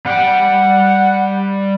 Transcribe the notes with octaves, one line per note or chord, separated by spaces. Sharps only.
G3 F#5 G5